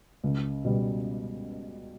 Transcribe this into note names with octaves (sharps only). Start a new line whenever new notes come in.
C#2
B2 G3